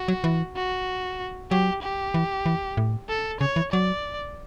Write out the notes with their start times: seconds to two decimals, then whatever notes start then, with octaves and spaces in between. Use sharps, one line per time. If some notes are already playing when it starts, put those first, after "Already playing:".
Already playing: F#4
0.08 F#3
0.24 E3
0.56 F#4
1.51 F#3 G4
1.82 G4
2.14 E3
2.46 E3
2.77 A2
3.09 A4
3.41 C#3 C#5
3.56 E3
3.72 F#3 D5